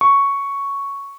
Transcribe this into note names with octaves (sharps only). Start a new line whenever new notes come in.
C#6